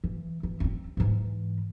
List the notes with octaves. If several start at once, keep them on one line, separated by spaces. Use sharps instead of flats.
E3
E3
C4 C#4
G#2 E3